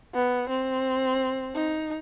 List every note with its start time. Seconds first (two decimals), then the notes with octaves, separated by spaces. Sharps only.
0.14 B3
0.49 C4
1.55 D#4